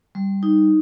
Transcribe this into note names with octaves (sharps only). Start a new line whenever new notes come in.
G3
D#4